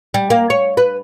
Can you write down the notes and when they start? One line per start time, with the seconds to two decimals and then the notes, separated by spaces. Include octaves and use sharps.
0.14 G3
0.30 A#3
0.50 C#5
0.77 B4